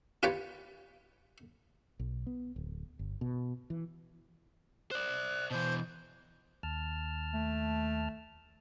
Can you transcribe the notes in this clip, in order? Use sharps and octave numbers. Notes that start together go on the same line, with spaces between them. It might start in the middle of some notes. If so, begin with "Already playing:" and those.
F4 G4 B4 C#5 D5
B1
B3
D1
G1
B2
E3
C5 D5 F#6
B2 E3 C5
D#2 A5 F6
A3